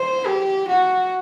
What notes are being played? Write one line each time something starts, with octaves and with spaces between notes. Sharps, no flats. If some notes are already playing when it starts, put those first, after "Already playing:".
Already playing: C5
G4
F#4